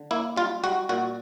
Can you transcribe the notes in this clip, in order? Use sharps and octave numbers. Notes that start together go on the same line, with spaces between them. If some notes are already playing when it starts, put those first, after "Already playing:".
Already playing: D3
A#3 E4
G3 F4
G3 F#4
A#2 F#4